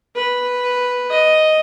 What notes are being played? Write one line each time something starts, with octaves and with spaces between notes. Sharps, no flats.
B4
D#5